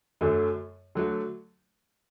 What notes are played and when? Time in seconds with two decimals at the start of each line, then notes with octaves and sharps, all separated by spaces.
0.21 F#2 D3 F#3 A3
0.95 D3 F#3 A3